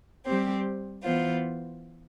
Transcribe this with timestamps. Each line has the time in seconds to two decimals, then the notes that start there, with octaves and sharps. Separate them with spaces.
0.24 G3 C4 G4 C5
1.03 E3 B3 F4 C5